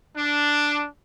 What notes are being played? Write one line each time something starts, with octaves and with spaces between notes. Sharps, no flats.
D4